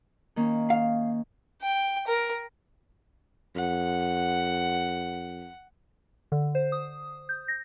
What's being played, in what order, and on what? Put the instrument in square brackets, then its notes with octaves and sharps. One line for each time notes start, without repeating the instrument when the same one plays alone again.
[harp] D#3 A#3 C#4
[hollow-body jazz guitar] F5
[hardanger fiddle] G5
A#4
[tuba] F2 [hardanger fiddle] F#5
[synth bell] D3
C5
D#6
G6
A#6